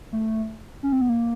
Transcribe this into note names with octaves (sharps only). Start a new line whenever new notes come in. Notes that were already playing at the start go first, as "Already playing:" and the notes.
A3
C#4
C4
B3
A#3